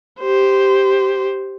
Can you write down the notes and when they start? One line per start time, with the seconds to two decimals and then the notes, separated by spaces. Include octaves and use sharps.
0.21 G4 C5